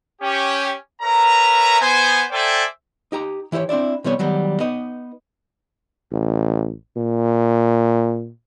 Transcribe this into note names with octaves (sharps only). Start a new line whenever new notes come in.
C#4 G4
A#4 B4 C#5 E5 A#5
B3 C5 G#5
A4 C5 D5 E5 G5 G#5
D#4 G4 A#5
E3 E4 G4 C5 C#5
C4 D4 E4 D5
C3 E3 G3 B3 C#5
D#3 F#3 G3 B3
B3 D#4 D#5
A1
A#2